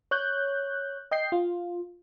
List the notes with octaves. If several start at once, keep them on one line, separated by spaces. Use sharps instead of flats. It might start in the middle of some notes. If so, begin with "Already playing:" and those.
C#5 F#6 G6
D#5 G5 G6 C7
F4